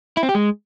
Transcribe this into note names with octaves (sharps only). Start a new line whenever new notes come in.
E4
C4
G4
G#3